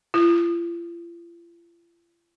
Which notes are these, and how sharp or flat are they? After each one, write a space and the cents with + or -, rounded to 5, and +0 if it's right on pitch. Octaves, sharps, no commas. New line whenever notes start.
F4 -40